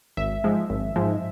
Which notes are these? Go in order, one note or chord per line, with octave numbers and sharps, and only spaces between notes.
G#1 E5
G#2 F3 G#3
G#1
G#2 F3 G#3